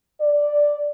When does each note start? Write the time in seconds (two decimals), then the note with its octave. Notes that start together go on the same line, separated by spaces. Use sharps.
0.21 D5